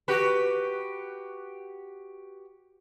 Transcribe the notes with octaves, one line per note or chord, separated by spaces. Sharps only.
F#4 G4 B4